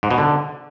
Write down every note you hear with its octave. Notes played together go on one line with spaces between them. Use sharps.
G#2
B2
D3